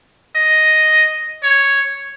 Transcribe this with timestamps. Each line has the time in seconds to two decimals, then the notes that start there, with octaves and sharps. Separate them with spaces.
0.36 D#5
1.43 C#5